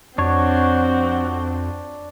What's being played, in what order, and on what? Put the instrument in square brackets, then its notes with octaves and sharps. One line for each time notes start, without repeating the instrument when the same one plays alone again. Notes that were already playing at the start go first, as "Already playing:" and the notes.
[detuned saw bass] F2 [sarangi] C4 [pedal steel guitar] D4 C#5 [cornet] F#4